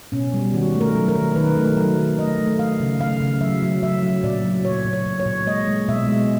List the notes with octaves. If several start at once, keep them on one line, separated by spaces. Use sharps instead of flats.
B2 C#4
G3
D#3 F#4
A3
A#4
F#3
A#4
D#3
D#3 B4
A3
F#3 A#4
D#3
A3 D#5
A3
A3 F5
C#3
A3 F5
C#3
F#3 E5
F#3
F#3 E5
F#3
A#2 D5
F#3
A#2 C#5
A#2
C#5
A#2
C#5
A#2
G#3 D#5
G#3
B2 E5
G#3